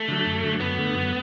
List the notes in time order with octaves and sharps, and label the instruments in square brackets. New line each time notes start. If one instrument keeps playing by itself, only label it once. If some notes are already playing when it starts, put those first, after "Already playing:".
Already playing: [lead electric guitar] A3
[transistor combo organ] D3 F#3
F#2
D3 F#3
[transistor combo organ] F#2 [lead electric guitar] B3
[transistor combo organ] D3 A3
F#2